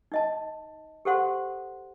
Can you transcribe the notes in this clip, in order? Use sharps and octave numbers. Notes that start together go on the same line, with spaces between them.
D#4 D#5 A5
G4 A4 C5 F#5 C6